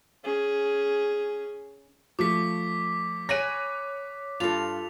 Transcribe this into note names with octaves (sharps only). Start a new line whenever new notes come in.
C#4 G#4
F3 A3 D6 B6
C#5 G#5 B5 C#6 F#6 A#6 D#7
G2 F4 A4 F7